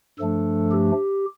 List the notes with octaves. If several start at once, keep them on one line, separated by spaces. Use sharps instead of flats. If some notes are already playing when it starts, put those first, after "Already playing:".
G2 F3 A3 D4 A4
G4